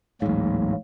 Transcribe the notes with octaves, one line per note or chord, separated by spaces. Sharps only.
A1 D2 G#2 F#3 A#3